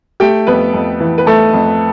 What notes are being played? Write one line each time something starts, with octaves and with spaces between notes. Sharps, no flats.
A3 G4 G5
F2 B3 B4
F2
E3
B4
A3 A4
F2